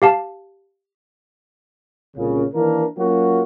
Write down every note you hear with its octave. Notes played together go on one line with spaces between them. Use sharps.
G4 F5 A5
C2 A#2 C#3
D#3 E3 A#3 D4 A#4
F#3 A#3 C#4 F4 F#4